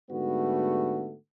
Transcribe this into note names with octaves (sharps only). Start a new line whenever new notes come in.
G#2 D3 G3 A3 B3 F#4